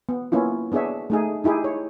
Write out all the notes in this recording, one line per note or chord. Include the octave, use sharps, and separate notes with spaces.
B3
A#3 B3 C#4 E4 F4
B3 D4 G#4 C#5 E5
A3 D#4 G#4
D#4 E4 G4 G#4
C#5